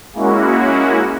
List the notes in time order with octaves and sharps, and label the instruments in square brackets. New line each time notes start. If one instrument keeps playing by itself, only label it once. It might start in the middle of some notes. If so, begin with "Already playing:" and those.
[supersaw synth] G#3 A#3 C#4 E4 F#4